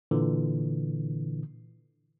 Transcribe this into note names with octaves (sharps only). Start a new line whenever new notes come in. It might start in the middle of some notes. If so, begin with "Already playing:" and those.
A#2 D3 E3